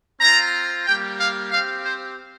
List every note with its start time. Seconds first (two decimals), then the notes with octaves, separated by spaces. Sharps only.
0.20 C4 F4 A#5
0.85 G3 A#3 G4 G5
1.18 F5
1.51 C4 G4 F5
1.84 C5